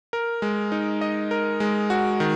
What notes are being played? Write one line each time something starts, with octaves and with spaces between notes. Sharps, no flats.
A#4
G#3
D#4
D#5
A#4
G#3
F#4
D#3